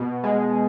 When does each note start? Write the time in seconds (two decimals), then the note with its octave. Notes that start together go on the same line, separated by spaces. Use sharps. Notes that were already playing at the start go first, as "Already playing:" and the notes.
Already playing: B2
0.24 G#3